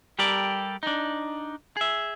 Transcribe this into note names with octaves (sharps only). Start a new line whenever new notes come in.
G3 G4 A4 A#4 D5
D4 D#4
G#4 E5